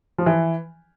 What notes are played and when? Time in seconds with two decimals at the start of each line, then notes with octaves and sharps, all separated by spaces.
0.18 F3
0.26 E3